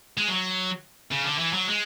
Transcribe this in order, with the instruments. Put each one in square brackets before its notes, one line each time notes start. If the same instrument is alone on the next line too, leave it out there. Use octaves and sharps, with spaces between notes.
[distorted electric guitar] G#3
F#3
C#3
D3
E3
F#3
G#3